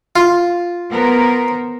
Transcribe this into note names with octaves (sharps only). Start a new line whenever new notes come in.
F4
B3 A#4 C5